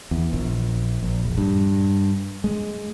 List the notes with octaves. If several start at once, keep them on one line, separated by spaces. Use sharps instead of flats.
E2
A#1
A#1
E1
G2
G#3